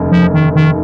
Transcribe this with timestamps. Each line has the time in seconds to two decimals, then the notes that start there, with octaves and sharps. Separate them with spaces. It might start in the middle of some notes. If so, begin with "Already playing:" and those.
Already playing: F1 D#2 C#3
0.11 F3
0.34 D#3
0.56 D#3